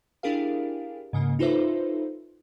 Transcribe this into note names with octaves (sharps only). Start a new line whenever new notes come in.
D4 E4 G4 G#4 A#4 F5
G#2 C#3 A#3
D#4 F4 A4 B4 C5 E5